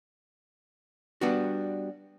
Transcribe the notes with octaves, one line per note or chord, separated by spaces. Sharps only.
G3 B3 D4 F#4